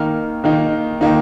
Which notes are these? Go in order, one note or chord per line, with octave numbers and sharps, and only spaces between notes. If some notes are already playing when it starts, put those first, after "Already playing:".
Already playing: D#3 A#3 D#4 F6
D#3 A#3 D#4
D#3 A#3 D#4